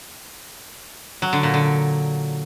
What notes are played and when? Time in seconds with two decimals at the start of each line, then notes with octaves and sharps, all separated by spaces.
1.22 F#3
1.33 D3
1.43 A#2
1.54 D3